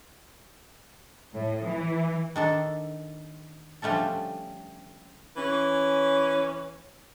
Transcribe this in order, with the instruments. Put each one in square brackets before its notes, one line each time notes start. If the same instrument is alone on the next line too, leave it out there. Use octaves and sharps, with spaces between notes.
[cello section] A2
E3
[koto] D#3 D4 A4
D3 F3 G3 A3 C#4 A4
[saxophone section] E3 C#4